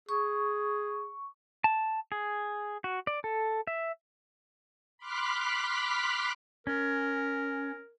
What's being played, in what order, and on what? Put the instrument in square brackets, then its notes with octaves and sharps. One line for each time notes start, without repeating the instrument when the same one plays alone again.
[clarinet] G#4 [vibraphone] C#6
[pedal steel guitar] A5
G#4
F#4
D5
A4
E5
[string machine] B5 C6 D6 F6 F#6 B6
[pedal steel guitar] C#4 [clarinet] A#4